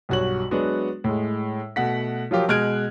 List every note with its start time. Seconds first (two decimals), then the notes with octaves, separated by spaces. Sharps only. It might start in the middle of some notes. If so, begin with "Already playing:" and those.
0.09 B1 G2 F#4 C#5 F#7
0.51 F#3 G#3 B3 D4 F#4
1.04 A2 G#3
1.76 B2 A3 F#5 B6
2.31 F3 F#3 F4 G4 A#4
2.48 B2 G#3 F6 F#6 G#6 D7